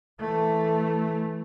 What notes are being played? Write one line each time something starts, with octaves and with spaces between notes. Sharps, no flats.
E3 A3